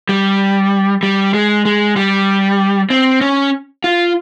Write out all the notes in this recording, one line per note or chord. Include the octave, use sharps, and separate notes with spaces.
G3
G3
G#3
G#3
G3
C4
C#4
F4